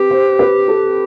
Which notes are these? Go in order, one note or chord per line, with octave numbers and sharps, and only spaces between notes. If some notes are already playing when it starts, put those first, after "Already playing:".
Already playing: C4 G4 B4
C5
B4
A4